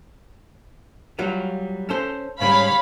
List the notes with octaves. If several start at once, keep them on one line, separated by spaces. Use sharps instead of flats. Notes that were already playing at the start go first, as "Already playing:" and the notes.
F#3 G3 F4
C#4 A4 C5
G#2 C#3 G3 C#5 F5 B5